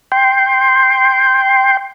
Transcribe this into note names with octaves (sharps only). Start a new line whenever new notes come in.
G5 C6